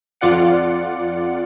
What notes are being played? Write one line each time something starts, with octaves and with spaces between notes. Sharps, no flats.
F2 F4 D5 F#5 C#7